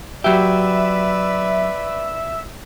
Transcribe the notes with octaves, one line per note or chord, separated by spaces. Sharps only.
F#3 G4 B4 D5 E5